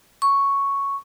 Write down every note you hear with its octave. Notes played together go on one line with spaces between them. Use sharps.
C#6